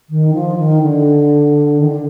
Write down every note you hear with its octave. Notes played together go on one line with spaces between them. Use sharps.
D#3
F3
D#3
D3
D#3
D3